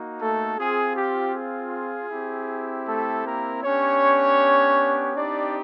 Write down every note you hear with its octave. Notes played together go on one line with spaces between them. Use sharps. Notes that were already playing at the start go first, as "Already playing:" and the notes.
Already playing: A#3 D#4 F#4
A3 A4
C4 F4 G#4
G4
G#4
C4 E4 G4
A3 A4
A#3 A#4
B3 C#4 D4 G4 C#5
C4 D4 D#4 G4 D5